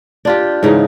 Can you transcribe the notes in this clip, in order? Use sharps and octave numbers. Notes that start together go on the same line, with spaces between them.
D4 F4 G4
G#2 C#3 E3 D#4